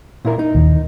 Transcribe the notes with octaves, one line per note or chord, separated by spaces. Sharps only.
A#2 E4 A#4
D#4
D#2 A#2